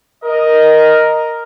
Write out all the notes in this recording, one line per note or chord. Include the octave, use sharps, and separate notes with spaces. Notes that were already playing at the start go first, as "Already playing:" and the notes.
A#4 D#5